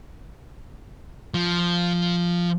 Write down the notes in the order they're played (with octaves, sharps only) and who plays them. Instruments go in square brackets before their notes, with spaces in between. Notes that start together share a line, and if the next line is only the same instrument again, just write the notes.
[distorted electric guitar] F3